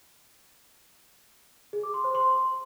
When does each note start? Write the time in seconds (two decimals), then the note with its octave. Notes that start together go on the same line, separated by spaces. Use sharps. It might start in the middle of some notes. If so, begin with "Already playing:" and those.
1.73 G#4
1.83 D6
1.94 C6
2.04 C5
2.15 C6